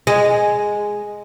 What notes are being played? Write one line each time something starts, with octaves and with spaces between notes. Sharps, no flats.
G#3